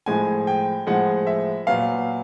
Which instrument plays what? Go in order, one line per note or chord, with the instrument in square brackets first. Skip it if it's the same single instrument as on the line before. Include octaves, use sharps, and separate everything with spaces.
[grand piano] A2 F3 G#3 G#5
G5
A2 F3 G#3 F#5
E5
A#2 F#3 B3 F5